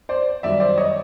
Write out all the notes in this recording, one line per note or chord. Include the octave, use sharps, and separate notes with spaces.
C5 D5
F#2 D#3 G3 D5 E5
C5 D5
C#5 D#5